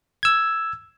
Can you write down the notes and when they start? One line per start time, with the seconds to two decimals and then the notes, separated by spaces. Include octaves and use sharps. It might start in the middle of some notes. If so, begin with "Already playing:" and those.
0.23 E6 G#6